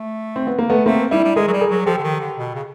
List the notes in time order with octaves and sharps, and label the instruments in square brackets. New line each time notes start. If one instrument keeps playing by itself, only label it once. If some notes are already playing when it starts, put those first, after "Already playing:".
Already playing: [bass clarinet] A3
[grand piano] C4
B3
A#3
A3 B3
[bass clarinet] A3 [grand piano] A#3 C4
[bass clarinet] G3 [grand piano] D4 E4
[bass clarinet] G3
[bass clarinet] G#3 [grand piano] G#4 A#4
[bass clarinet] F#3
G3
[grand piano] G#4 A#4
[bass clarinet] F#3
[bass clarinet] F3 [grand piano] G4 A4
[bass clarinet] D3
D#3
D3
B2
C#3